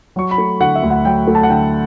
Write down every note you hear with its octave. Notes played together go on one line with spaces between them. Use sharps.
F#3 C#6
B5
A3
D3 F#5
E5
D2
F#5
F#3 G5
A3
A5
F#5
D3 G5